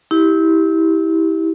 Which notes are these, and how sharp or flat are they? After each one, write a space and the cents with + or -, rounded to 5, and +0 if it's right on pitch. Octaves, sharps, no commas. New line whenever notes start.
E4 -25 G4 +0